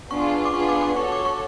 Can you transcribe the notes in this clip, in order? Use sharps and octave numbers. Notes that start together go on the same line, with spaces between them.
B3 D4 F4 G#4 C#6
D6
B3 D4 F4 G#4 C#6
D6
D6
F#4 A4 C#5 C#6
D6
C#6